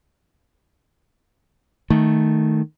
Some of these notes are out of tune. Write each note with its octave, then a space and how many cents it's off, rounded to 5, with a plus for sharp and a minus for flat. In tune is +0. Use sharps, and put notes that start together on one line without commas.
D#3 +0 A3 +0